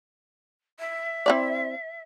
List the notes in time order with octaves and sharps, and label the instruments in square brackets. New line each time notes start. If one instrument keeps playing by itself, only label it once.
[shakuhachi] E5
[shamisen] C4 E4 D5